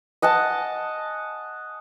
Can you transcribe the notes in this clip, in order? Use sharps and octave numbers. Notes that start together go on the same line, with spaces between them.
D#5 F#5 G#5 A5